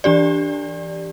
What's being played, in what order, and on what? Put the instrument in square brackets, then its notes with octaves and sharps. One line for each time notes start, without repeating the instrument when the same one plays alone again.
[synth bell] E3 D4 G4 D5